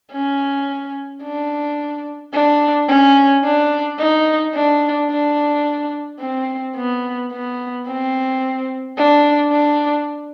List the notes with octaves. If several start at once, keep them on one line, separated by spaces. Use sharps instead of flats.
C#4
D4
D4
C#4
D4
D#4
D4
D4
C4
B3
B3
C4
D4
D4